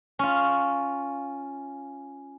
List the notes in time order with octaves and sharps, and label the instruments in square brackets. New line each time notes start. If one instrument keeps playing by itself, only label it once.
[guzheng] C#4 F4